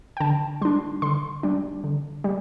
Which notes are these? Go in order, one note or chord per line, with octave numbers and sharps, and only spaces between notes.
G5
D3 A5
G3 D4 C6
D3 C6
G3 D4
D3
G3